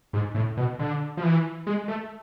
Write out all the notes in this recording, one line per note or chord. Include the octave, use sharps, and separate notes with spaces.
G#2
A2
B2
D3
F3
E3
G#3
A3